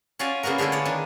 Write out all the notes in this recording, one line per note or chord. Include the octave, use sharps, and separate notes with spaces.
C#4 F4 F#4 D5 F5 G#5
C#3 A#3 B3 F#4 A#4
D3 G#3 A3 E4 F4
C#5 D5
D#3 D4